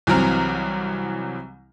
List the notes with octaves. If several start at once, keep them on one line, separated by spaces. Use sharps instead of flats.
C2 E3 F#3 C4 A#5 F6